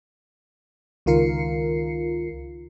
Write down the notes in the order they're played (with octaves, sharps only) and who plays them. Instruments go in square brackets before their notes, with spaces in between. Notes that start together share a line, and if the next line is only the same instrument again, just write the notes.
[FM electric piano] C#2 D#3 F4 A#4 C7 C#7